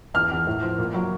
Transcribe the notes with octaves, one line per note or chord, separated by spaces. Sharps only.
E2 F6
E2
A2
F3
A#2
F#3